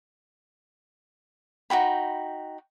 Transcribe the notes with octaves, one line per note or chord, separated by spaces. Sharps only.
D#4 F#4 G5 B5